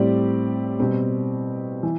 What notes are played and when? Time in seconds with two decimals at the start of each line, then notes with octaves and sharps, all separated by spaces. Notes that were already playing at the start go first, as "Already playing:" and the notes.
Already playing: A2 G3 C4 G4 D5
0.80 B2 G3 C4
1.83 E3